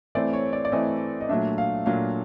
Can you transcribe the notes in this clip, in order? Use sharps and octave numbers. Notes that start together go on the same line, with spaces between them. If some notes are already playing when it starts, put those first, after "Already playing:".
E3 A3 C4 D5
C#5
D5
D5
E3 A3 C4 D#5
D#5
A#2 F#3 A3 D4 E5
F5
A#2 F#3 A3 D4 F5